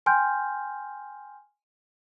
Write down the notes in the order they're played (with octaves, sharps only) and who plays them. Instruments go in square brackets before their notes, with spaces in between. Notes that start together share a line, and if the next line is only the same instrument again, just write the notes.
[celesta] G5 G#5 C6 F6 G6